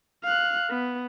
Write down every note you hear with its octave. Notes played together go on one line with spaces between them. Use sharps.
F5 F#6
B3